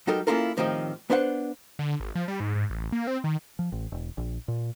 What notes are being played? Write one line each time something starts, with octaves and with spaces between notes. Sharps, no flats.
F#3 G3 D#4 G4 A4 A#4
A#3 C#4 E4 F4 A4 A#4
A2 D#3 F3 C4 D#4 G4
B3 D4 B4 C5 D#5 F#5
D3
G#1
F3
G3
G#2
G#2
A1
A#3
C4
D#3
F3
A1
E1
A#1
A#2